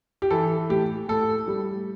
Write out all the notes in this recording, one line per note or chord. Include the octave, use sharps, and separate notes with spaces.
G4
E3 A4
A2 G4
A2 A4
G3